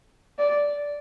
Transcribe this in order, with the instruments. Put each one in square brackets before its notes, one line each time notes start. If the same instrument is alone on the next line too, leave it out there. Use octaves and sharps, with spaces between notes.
[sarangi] D5